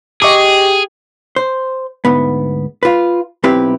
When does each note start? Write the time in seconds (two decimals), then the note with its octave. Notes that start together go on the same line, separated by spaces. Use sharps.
0.22 G4 G#4 D#5 C#6 D6
1.36 C5
2.05 D2 G#2 B3
2.83 F4 B4
3.44 B1 C4 E4 G4 B4